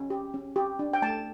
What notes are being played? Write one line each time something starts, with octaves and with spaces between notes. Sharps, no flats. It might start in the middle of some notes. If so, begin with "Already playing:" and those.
Already playing: C#4
G4
C#4
G4
D4
G5
A3 A5